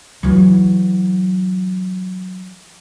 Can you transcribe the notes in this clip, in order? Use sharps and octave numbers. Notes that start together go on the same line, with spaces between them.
E3 F#3